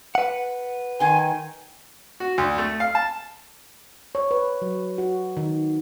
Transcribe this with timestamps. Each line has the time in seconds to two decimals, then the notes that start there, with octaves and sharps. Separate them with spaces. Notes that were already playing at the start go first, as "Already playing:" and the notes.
0.15 B4 F#5
1.00 D#3 G#5 C6
2.20 F#4
2.38 D2
2.58 A3
2.80 F5
2.95 A5
4.15 C#5
4.31 B4
4.62 F#3
4.98 F#4
5.37 D#3